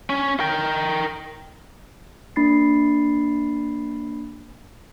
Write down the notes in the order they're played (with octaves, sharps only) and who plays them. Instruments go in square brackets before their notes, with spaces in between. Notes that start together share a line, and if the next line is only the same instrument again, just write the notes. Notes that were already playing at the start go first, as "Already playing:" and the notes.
[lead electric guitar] C#4
A#4 G5
[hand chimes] A#3 D4 B5 A6 C7